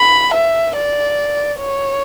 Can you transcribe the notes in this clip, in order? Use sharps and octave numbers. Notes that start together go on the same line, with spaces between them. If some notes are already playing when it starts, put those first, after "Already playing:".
Already playing: B5
E5
D5
C#5